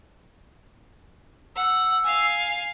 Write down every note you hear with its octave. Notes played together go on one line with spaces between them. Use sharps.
F#5 E6
F5 G#5